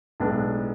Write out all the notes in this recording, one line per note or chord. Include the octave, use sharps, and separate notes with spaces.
B1 A2 G#3 B3 D4